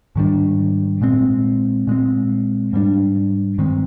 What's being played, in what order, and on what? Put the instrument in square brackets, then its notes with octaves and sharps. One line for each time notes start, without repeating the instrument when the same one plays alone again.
[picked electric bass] G#2 D#3 G3 D4
A#2 G#3 C4
A#2 G#3 C4
G#2 G3 A#3 D4
G2 D#3 G#3 C4